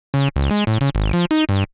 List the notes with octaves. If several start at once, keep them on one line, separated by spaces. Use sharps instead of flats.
C#3
C#2
G#3
A2
C#3
G#1
F3
D#4
G2